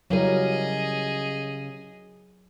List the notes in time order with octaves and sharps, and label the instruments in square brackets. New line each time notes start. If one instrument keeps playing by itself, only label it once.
[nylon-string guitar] C#3 G3 [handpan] F#3 E4 A#4 [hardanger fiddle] G#4 D#5